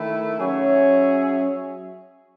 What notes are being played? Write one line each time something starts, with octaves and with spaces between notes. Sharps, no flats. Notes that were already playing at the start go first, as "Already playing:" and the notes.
Already playing: D#3 A3 E4
F#3 C#4 G#4 C#5 E5